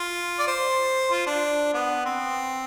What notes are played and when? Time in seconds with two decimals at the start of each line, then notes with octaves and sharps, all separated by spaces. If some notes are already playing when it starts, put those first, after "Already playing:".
Already playing: F4
0.39 D5
0.48 C5
1.11 F4
1.26 D4
1.74 B3
2.05 C4